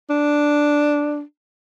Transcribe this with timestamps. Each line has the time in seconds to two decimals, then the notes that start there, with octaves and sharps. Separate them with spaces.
0.10 D4